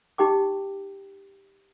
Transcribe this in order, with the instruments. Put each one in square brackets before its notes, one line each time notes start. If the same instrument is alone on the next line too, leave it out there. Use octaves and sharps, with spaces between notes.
[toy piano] D#4 G4 G5 D6